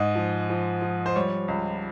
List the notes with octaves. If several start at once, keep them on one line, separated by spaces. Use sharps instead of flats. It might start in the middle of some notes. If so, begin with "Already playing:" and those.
Already playing: G#2 D#5
F3
F3
F3
C5
G3 C#5
C#2